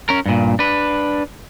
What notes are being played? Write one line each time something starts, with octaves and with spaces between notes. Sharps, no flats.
C#4 A#4
G2 A#2
D4 B4